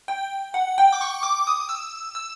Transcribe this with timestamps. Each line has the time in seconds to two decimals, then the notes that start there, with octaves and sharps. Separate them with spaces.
0.08 G5
0.54 F#5
0.78 G5
0.93 D6
1.01 C#6
1.23 D6
1.47 D#6
1.69 E6
2.15 E6